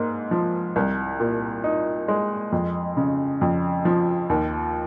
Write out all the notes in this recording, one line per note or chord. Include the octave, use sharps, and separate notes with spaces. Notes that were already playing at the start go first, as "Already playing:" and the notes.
Already playing: G#2 A#3
F3
C2
A#2
D#4
G#3
F2
C#3
F2
F3
D#2